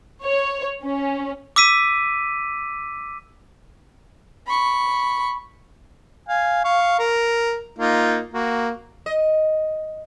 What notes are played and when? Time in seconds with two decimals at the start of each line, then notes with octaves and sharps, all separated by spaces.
0.23 C#5
0.84 C#4
1.56 D6 E6 B6 D#7
4.47 B5 C#6
6.28 F5 G#5
6.64 F5 C#6
6.99 A#4
7.79 A#3 D#4 F4
8.34 A#3 F#4
9.06 D#5